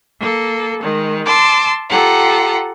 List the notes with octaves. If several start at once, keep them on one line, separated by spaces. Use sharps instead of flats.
A#3 A4
D#3 G#3
A5 C6 D6 E6
F4 G4 A4 F#5 A#5